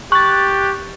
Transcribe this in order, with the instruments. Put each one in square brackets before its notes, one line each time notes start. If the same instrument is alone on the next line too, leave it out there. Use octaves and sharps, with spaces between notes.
[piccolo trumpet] G4 [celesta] C#6 [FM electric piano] F#6 A6